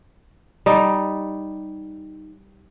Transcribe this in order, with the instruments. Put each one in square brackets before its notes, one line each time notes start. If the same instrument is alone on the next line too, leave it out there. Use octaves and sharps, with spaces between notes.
[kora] G3 D#4